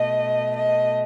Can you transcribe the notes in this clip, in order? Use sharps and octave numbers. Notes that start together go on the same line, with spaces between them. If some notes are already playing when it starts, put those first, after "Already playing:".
Already playing: B2 A3 D#5
D#5